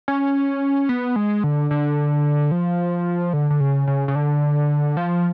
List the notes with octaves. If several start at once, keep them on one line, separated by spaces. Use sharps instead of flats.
C#4
B3
G#3
D3
D3
F3
D3
D3
C#3
C#3
C#3
D3
F3